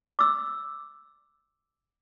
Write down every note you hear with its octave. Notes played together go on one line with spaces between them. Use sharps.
D6 E6